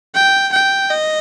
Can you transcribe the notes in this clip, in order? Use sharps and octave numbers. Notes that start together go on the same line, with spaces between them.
G5
G5
D#5